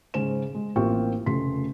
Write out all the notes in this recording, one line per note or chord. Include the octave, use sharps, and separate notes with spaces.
G#2 C#3 C#4 G#4 C5 E7
G#3
A1 A#3 C4 F4 G5 C#6
F1 C#3 A3 C6 B6